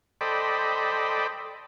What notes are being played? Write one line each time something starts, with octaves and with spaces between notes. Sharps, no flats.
A4 C5 D5 D#5 G5 B5